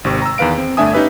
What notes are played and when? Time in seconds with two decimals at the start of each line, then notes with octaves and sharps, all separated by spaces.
0.04 G#1 C3 C#6
0.22 A#5 E6
0.38 E2 D#3 B4 F5 D7
0.58 C4
0.77 G1 A3 D4 E5 G#5 D#6
0.93 C#4 D#4 G4 B4 E5